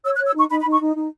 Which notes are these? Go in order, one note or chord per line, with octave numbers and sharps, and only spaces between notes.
C#5 E6
F#6
C#5
E6
D#4 C#6
D#4 B5
B5
D#4
C#6
D#4
D#4